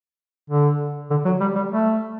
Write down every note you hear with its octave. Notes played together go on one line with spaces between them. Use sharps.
D3
D3
F#3
G3
G3
A3